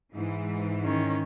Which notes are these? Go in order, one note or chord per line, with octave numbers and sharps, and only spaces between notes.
G#2 E3
D#3 C#4